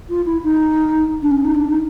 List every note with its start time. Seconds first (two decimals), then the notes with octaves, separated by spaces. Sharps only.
0.09 F4
0.25 E4
0.43 D#4
1.22 D4
1.31 C#4
1.44 D#4
1.54 D4
1.69 D#4